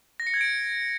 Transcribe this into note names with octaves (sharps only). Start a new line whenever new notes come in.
A#6
C#7
G#6
D7